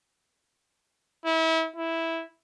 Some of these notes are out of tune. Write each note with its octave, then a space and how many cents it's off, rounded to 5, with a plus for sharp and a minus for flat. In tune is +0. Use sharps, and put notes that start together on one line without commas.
E4 -30
E4 -5